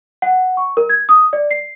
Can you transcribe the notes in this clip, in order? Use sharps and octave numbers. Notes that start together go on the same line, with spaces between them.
F#5
C#6
A#4
G#6
D#6
D5
C7